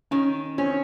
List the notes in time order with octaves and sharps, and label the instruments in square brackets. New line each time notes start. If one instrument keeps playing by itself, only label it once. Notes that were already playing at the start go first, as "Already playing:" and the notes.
[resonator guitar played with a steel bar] D#3 [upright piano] C#4
[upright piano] C4 [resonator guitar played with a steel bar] C#4